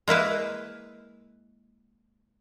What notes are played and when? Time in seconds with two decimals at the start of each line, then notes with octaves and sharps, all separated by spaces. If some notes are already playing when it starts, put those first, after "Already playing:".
0.08 G#3 A#3 E4 B4